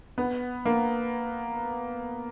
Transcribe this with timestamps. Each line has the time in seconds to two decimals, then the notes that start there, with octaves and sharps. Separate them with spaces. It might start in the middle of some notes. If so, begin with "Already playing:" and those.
0.18 B3
0.65 A#3